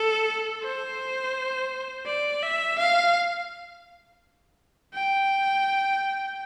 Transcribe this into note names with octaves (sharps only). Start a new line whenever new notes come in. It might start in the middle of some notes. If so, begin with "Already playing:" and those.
Already playing: A4
C5
D5
E5
F5
G5